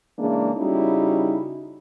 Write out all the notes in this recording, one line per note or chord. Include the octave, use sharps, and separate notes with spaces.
C#3 E3 G#3 A#3 D4 G#4
C#3 G3 C#4 D#4 E4 F#4